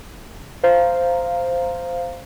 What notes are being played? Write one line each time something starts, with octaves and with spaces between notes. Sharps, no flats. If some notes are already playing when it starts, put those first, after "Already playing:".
C5 F5 A#5